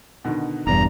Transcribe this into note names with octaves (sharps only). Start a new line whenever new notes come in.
B2 D3 D#3
E1 E2 G2 D4 A#5